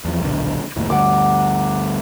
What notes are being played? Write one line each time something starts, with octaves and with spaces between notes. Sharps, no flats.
E2 F3
D#1 B1 D3
F1 D#2 A2
D2 G2 F#5 D6